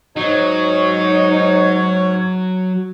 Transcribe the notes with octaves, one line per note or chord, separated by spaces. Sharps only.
G#2 F#3 D#4 C#5